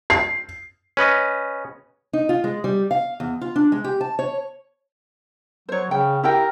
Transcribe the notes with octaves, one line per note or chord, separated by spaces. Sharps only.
C7
C#4 B4 D#5
D#4
F4
G#3
G3
F5
E2
F4
D4
G#3
G4
A5
C#5
F#3 C5 C#5
C#3 G5
E4 G4 A#4 G5